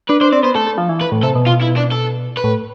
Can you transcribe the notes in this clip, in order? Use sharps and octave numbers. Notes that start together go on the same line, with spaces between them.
D4 B4
D4 C5
C4 D5
B3 C5
A3 A4
A3
F3
E3
B4
A2
C3 A4
B2
F4
E4
D4
A4
B4
A2